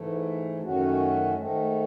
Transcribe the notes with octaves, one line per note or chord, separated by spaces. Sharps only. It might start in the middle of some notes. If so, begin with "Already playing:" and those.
Already playing: G#2 E3 A3
F#2 D#3 A3 C#4 F#4
G#2 D#3 A3